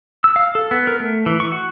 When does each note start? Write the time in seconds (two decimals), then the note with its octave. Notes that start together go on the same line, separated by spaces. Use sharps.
0.24 E6
0.36 F5
0.55 A4
0.71 B3
0.87 A#4
1.00 A3
1.26 E3
1.40 C#6
1.52 F#4